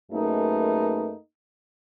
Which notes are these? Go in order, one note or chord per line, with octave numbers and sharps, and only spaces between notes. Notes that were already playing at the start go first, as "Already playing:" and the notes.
F#2 A3 A#3 D#4 G#4 B4